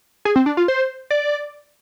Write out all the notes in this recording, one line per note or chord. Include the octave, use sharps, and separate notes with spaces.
G#4
C4
D4
F4
C5
D5